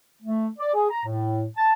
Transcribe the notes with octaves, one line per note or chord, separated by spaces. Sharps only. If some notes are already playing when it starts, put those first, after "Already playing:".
A3
D5
G#4
A#5
A2
A5